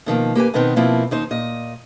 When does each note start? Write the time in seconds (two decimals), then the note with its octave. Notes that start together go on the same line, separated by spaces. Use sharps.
0.06 B2 D#3 F3 A#3
0.35 A#3 G4 B4 G#5
0.54 B2 D#3 B3 C4 D4 D#4
0.76 B2 F3 A#3 C4 E4 F4
1.11 D#2 D#4 C5
1.31 A#2 D#5